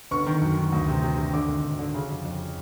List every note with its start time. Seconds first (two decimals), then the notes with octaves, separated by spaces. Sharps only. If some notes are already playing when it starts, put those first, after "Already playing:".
0.11 G1 C#6
0.26 D#3
0.42 F#2
0.57 D#3
0.72 D2
0.88 C3
1.02 C3
1.17 C3
1.33 D3 D6
1.48 G#1
1.64 G#1
1.79 D3
1.94 C#3
2.10 F2
2.24 F2